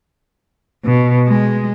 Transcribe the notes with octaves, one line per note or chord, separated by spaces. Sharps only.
B2
G#3